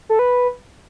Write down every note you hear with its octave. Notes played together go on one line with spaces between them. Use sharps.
A4
B4